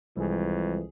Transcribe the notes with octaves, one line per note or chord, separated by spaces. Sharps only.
C2 F2 E3 G3 G#3 G#4